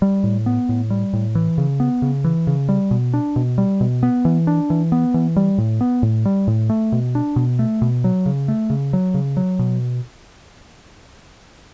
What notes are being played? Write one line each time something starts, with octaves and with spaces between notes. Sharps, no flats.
G3
A2
B3
A2
G3
A2
E3
C#3
B3
C#3
E3
C#3
G3
B2
D4
B2
G3
B2
B3
E3
D4
E3
B3
E3
G3
A2
B3
A2
G3
A2
A3
B2
D4
B2
A3
B2
F#3
C#3
A3
C#3
F#3
C#3
F#3
B2